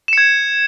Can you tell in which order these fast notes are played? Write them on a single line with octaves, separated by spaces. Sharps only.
E7 C#7 G#6